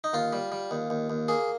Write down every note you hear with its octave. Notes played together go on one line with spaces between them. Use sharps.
D#4
D#2 F4
G3
G3
D#2
D#2
D#2
A#3 G#4